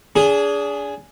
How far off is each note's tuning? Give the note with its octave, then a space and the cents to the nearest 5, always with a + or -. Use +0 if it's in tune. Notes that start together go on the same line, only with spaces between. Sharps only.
D4 -30 G#4 +0